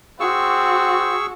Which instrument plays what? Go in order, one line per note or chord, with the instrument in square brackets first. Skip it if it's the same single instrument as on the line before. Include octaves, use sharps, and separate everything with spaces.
[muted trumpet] C4 [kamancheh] F#4 [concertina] G#4 C#6 E6